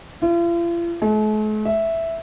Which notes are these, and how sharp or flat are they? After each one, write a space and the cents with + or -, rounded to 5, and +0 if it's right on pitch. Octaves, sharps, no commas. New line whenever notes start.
F4 -45
A3 -45
E5 +0